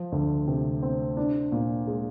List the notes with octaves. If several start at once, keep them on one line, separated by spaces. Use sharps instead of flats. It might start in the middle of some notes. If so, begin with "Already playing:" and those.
Already playing: F3
D2
C3
C4
D4
A#2
G#3